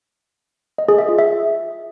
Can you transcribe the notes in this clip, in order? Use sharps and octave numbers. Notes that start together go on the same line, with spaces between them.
D#5
G#4
E5
F4
E5